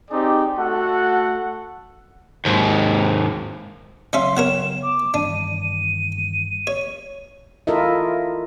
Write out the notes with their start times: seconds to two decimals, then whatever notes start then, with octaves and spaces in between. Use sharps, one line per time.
0.10 C4 D#4 G4 G#4 D5
0.58 A3 F#4 A4 F#5
2.45 D#2 G#2
4.13 C#3 F#3 C#4 E5 F5 C6
4.37 B3 A#4 C#5 F#5 E7
4.82 D6
5.14 G2 D#3 E3 D4 D#7
6.67 C#5
7.67 E4 F4 A4 A#4 D#5 E5